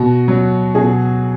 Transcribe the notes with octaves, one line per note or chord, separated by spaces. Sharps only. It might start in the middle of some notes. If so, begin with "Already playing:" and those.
Already playing: B2 F#4
F#3
B2 G#4